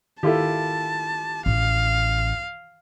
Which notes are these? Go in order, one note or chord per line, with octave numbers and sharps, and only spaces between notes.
D#3 E4 F4 G4 A4 A5
A1 F5